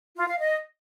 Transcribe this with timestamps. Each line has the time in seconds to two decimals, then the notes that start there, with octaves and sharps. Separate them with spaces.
0.16 F4
0.28 F5
0.39 D#5